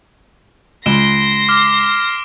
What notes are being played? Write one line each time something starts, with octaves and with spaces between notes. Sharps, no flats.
C#2 C6 A#6 D7 E7 G7
D6 F6